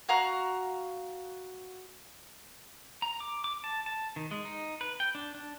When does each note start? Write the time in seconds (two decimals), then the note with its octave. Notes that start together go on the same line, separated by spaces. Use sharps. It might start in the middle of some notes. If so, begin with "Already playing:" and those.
0.09 F#4 F5 A#5 F#6
3.02 A#5
3.20 D6
3.44 D6
3.64 A5
3.86 A5
4.16 D#3
4.31 G#3
4.45 D#4
4.81 B4
5.00 G5
5.15 D4
5.35 D4